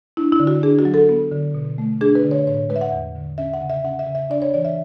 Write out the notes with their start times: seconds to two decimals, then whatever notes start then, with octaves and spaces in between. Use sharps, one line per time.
0.17 D4 E4
0.32 E4
0.40 D3
0.47 F#4
0.63 D4 G#4
0.79 F#4
0.85 F#3
0.94 A4
1.09 B3
1.31 D3
1.54 B2
1.78 A3
2.01 D4 G#4
2.15 B4
2.24 D3
2.31 C#5
2.47 A2 C#5
2.69 G#3 B4
2.76 E5
2.81 F#5
2.92 E2
3.15 D3
3.38 C#4 E5
3.54 F#5
3.61 C#3
3.70 E5
3.84 C#4 F#5
3.99 E5
4.07 C#3
4.15 E5
4.30 D4 D5
4.42 C#5
4.54 E3 D5
4.65 E5